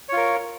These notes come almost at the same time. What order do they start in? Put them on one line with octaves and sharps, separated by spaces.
C#5 F4 A#4